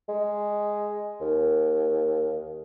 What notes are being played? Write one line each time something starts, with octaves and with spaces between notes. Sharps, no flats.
G#3
D#2